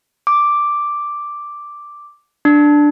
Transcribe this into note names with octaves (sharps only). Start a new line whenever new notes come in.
D6
D4